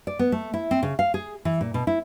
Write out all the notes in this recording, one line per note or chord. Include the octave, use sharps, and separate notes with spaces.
D5
B3
A3
E4
C4
C#3
F5
G#4
E3
A#2
B2
E4